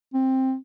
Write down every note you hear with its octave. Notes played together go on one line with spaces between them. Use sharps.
C4